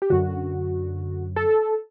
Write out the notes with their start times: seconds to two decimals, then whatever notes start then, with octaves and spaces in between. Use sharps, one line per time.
0.02 G4
0.10 F#2 D3 F#4
1.36 A4